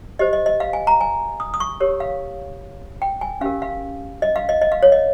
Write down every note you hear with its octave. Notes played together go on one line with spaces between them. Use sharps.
G4 C5 D#5
D#5
D#5
F5
G#5
A#5
G#5
D#6
D#6
C#6
G4 A#4 C#5
F5
G5
G#5
C#4 G4 A#4 F5
F5
D#5
F5
D#5
D#5
F5
C#5
D#5